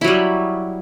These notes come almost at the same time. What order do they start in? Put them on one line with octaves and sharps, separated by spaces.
E4 F#3 G3